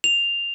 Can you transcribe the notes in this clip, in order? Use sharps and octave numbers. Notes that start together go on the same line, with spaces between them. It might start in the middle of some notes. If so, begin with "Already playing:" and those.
F7